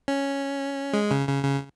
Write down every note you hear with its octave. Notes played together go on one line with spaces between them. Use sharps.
C#4
G#3
C#3
C#3
C#3